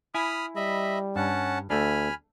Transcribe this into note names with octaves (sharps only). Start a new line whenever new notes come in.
E4 G#5 B5 D#6 F6
G3 D#5 E5 B5
G2 C#4 F#5 A5
D2 A3 D4 G#5 B5 F6